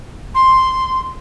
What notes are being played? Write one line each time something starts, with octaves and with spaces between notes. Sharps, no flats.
C6